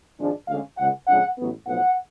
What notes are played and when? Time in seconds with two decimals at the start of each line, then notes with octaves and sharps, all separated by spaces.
0.19 G#1 G#2 F3 G#3 D4
0.48 D2 D3 G#3 C#4 F5
0.78 C#2 C#3 G#3 F#5
1.08 F2 C#3 G#3 D4 F#5
1.38 A1 A2 F#3 B3
1.67 B1 A2 F3 B3 F#5